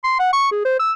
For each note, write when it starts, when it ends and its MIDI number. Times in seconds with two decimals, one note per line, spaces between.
0.04 0.17 84
0.19 0.33 78
0.33 0.51 85
0.52 0.63 68
0.65 0.75 72
0.79 0.92 88